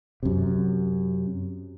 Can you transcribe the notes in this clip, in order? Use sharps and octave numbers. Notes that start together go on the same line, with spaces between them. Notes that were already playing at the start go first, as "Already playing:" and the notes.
F#2 C3